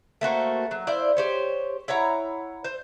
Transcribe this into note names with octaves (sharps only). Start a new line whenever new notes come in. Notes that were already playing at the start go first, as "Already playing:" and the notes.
A3 A#3 F#4 C5
F#3
E4 C5 D5 F5
G4 C5 C#5
E4 C#5 F#5 A#5
C5